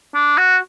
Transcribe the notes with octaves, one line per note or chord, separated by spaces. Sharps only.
D4
F#4